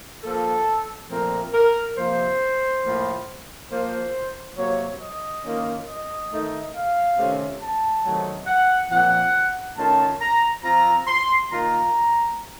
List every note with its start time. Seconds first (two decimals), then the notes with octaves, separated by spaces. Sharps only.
0.24 F3 A#3 F4 A4
1.10 A#2 F3 A3 C4 F4 A#4
1.54 A#4
1.97 C3 F3 A#3 C5
2.84 A2 F3 A#3 F4
3.70 F3 A#3 F4 C5
4.57 C3 F#3 A#3 C#5
5.01 D#5
5.44 D#3 A#3 C#4 F4
5.87 D#5
6.30 D#3 A3 D#4
6.73 F5
7.16 C3 D#3 A3 C#4 F4
7.60 A5
8.04 C3 D#3 F#3 A3 D#4
8.47 F#5
8.90 A#2 F3 C4 F#5
9.77 D#3 A3 C#4 F4 A5
10.20 A#5
10.63 F3 C4 F4 A#5
11.07 C6
11.50 D#3 A#3 F4 A#5